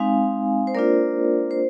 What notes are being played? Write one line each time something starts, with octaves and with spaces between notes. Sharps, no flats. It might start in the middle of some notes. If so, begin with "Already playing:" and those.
Already playing: G#3 C4 D#4 F5 G#5
C5
A#3 D4 F4 A#4 D5
C5